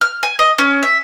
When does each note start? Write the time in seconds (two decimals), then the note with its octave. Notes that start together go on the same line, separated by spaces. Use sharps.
0.01 F6
0.23 G#5
0.39 D#5
0.58 C#4
0.83 E5